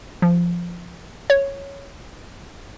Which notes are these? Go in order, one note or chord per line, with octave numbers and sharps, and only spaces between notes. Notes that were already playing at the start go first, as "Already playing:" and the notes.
F3
C#5